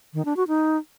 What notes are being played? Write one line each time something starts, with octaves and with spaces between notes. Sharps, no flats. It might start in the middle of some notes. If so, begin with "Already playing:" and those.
D#3
D4
F#4
D#4